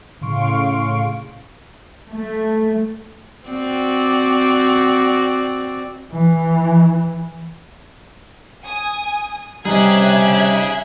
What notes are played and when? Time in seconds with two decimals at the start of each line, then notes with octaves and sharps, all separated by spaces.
0.21 A2 C#3 F5 C6 C#6 D7
2.10 A3
3.47 C4 F#4 D5
6.12 E3
8.63 G#5 D#6
9.65 C3 G3 C#4 D#4 G#4 E5 F#6 G#6